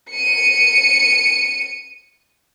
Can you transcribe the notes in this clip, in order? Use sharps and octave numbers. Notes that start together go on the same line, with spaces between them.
C#7 D#7